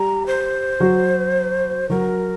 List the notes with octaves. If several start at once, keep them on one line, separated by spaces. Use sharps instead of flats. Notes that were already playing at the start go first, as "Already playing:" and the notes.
Already playing: G3 G4 A#5
C5
F#3 F#4
F#3 F#4 A#4